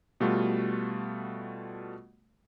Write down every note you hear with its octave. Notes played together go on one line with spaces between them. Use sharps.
B2 G3 A3 F4 F#4